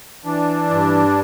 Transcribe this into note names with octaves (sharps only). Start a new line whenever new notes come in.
E3 D4
G2